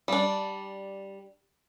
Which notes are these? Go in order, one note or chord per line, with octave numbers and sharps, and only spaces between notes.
G3 D4